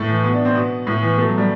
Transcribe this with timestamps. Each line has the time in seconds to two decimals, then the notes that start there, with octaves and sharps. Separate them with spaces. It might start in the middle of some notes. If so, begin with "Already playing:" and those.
Already playing: A2 A3
0.09 E3
0.24 B2 B3
0.34 D4
0.45 C4
0.55 B2 B3
0.87 A2
1.01 E3
1.18 B2 A3
1.28 F#3
1.38 G3